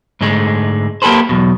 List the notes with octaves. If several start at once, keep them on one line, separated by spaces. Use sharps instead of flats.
G#2 D3 G#3 A3
A#3 G4 A4 B4 C5
B1 E2 B2